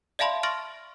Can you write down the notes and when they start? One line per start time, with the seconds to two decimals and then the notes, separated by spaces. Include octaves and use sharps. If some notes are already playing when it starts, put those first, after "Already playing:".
0.19 D5 E5 F5 A5 B5 C6
0.43 C6 C#6 F6 A6 A#6 D7